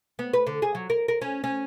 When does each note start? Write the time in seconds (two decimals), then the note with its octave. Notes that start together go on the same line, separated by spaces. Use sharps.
0.19 B3
0.34 B4
0.47 D3
0.62 G#4
0.75 F#3
0.90 A#4
1.08 A#4
1.21 C#4
1.44 C#4